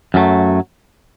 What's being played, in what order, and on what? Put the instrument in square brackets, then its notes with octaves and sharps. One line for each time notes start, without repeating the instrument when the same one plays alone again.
[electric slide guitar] F#2 F#3 A3